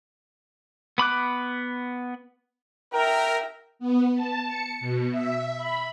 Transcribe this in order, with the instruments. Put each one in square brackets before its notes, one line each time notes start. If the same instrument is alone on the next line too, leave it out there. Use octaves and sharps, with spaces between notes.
[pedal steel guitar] B3 B5 D6 F#6
[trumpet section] A#4 [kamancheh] E5 G5
[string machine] B3
A5
C#7
B2
E5
B5